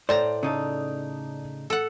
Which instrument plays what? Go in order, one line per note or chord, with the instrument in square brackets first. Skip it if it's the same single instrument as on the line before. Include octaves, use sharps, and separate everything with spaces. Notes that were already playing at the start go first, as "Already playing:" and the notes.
[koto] A2 A5 A#5 [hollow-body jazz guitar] C5 [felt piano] D5
[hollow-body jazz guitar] C#3 D#4 A4
[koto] A4 F#5